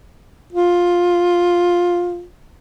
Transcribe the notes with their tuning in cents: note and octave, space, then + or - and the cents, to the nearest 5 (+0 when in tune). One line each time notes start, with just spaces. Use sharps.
F4 +10